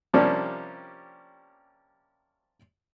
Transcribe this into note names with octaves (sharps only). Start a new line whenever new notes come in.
C3 F3 G3 A#3 C#4 D4